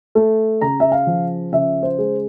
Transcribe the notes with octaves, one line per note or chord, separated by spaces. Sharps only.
A3
C#3 A#5
E5
F5
F3
C#3 E5
C5
G#3